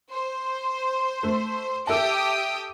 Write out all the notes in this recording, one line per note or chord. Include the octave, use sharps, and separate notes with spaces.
C5
A3
G4 A4 E5 G5 A5 D#6